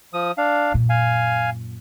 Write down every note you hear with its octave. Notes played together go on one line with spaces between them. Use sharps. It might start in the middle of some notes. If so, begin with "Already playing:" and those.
F3 D#6
D4 F5
F#2 A#2
F5 G#5